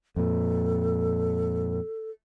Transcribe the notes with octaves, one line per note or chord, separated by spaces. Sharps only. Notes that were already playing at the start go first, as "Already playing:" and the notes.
F2 A#2 A4